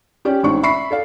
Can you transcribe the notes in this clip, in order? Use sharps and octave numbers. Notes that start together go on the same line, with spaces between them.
C#4 G4 C#5 D5
A1 G#2 C4 D4 C#6
E5 B5 C#6 C7
A4 D5 F5